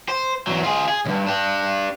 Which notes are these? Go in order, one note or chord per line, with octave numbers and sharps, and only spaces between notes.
C5
E2 F#3
F4 G#4
G#4
C#2 G2
D4 G4